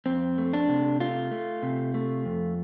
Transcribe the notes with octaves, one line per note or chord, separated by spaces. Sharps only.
F2 C4
A3
D4
C3
A3 F4
A3
C3
A3
F2